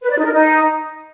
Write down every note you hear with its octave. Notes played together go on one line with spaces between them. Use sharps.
B4
D5
D#4
A#4
D#4